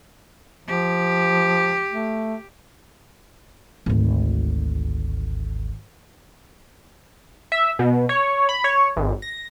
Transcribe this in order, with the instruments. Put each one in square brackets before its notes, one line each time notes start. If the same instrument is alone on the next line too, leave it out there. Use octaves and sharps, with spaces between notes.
[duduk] F3 [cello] G4
[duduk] A3
[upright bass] G#1 D2
[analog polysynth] E5
B2
C#5
B5
C#5
G#1
A#6